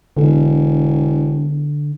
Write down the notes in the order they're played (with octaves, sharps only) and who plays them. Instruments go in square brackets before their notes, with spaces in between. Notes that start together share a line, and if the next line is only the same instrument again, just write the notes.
[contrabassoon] E1 [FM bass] D3